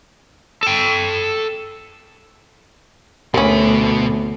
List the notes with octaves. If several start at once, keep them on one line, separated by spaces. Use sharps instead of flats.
A4 G5
D2 B2 C#4 A#4 B5